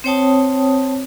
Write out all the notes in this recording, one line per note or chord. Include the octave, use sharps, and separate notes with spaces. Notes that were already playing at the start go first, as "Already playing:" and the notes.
C4 C5 C#5 G5 A5 D#6